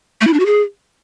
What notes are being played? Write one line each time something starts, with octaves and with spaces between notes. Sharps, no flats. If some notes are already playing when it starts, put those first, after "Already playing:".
A3
E4
D4
F#4
G#4